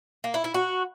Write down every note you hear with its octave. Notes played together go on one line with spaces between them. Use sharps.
A#3
E4
E4
F#4